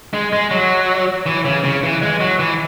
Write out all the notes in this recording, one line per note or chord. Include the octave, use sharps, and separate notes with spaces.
G#3
G#3
F#3
E3
C#3
C#3
E3
G#3
F#3
E3